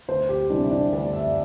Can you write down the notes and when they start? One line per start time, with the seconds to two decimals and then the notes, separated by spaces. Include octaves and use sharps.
0.08 D2 C5
0.29 G4
0.50 C3 E3 G3 D4
0.71 D4
0.92 D2 D5
1.13 E5